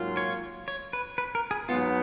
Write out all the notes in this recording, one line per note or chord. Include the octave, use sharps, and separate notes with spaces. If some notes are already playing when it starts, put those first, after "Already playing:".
Already playing: G#2 F#3 A#3 F4
C#5
C#5
B4
B4
A#4
G#4
G#2 F#3 B3 F4